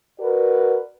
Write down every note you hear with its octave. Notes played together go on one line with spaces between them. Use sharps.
F#4 A#4 B4 D5